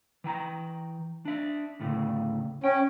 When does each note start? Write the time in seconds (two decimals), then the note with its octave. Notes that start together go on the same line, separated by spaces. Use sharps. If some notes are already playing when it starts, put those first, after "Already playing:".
0.24 E3 G5 A#5
1.25 D4 E5
1.79 D2 A2 C#3
2.64 C#4 G5